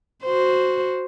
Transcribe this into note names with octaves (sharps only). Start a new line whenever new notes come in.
F#4 C5